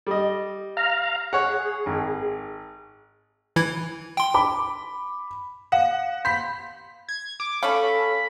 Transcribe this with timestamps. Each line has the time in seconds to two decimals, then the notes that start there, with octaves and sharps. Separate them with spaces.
0.07 G3 D#5
0.77 F5 A#5 F6
1.33 G#4 C#5 F#5
1.86 G#1
3.56 E3 E4 G#6
4.17 G5 C6
4.34 B5 D6
5.72 F5 F#5
6.25 B5 C6 G6 B6
7.08 G#6
7.40 D6
7.63 A3 C#4 A4 F5 B5